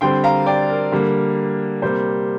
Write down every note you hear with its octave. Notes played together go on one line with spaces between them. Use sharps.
D3 G3 C4 G5 C6
F5 A#5
D5 G5
A#4
D3 G3 A#3
C3 G3 A#3 C5